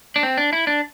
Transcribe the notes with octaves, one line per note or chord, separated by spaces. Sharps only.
D4
C4
D4
E4
D4